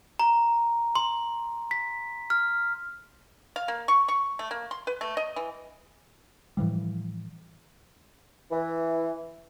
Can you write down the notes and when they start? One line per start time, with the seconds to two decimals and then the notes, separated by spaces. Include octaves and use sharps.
0.19 A#5
0.95 C6
1.71 B6
2.30 F6
3.56 F5
3.68 A#3
3.88 C#6
4.08 C#6
4.39 A3
4.51 A#3
4.71 C6
4.87 B4
5.01 A3
5.17 D#5
5.36 E3
6.57 A2 E3 F3 G3
8.51 E3